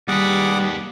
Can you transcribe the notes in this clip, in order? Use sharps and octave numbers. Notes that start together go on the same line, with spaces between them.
D#2 G3 G#4 B4 F#5 D6